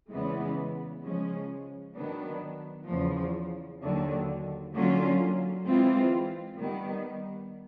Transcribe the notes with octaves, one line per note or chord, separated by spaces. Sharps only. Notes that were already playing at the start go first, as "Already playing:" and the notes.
E2 C#3 E3 G#3 B3
C#3 F3 G#3 C#4
D#3 F#3 B3 D4
E2 C#3 F3
D#2 D3 F#3
D3 F#3 A#3 C#4 F4
E3 G#3 C4 F4
D#3 G3 B3